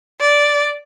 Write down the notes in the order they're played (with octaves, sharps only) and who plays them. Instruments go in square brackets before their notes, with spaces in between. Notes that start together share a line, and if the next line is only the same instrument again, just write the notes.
[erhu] D5